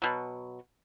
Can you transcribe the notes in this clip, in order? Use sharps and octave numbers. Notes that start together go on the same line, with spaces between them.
B2 F#3